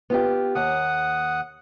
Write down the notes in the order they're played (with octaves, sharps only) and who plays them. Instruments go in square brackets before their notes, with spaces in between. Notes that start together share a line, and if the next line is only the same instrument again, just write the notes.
[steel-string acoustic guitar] B3 F4 G4
[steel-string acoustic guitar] D#2 [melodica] F#5 D#6